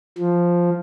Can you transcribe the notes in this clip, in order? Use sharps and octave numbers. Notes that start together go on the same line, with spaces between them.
F3